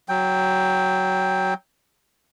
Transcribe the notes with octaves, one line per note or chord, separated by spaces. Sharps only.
F#3 G5